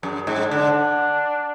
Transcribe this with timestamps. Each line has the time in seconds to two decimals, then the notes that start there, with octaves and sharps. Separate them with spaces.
0.03 F#2 G#4
0.27 G#2
0.40 D4
0.51 D3